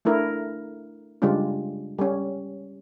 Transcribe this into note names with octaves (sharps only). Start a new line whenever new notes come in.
A3 D4 E4 A#4
C#3 G3 G#3 D4 F4
G3 C#4